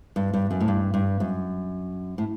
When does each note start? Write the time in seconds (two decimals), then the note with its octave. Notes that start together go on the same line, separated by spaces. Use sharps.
0.16 G2
0.34 G2
0.51 F#2
0.61 A2
0.68 G2
0.94 G2
1.20 F#2
2.18 A2